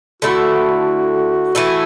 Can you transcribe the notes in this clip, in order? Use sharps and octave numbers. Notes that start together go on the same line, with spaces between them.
D3 A3 E4 F#4 A4
E3 A3 E4